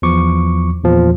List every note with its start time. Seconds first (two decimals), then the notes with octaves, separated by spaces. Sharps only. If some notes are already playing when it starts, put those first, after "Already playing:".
0.02 E2 F3 C#6 D6
0.84 E2 A#2 F3